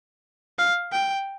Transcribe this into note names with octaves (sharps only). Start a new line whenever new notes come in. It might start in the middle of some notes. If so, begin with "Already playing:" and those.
F5
G5